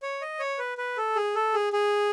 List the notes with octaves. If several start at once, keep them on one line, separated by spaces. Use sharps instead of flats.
C#5
D#5
C#5
B4
B4
A4
G#4
A4
G#4
G#4